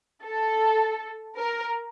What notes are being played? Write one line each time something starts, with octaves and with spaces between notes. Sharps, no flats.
A4
A#4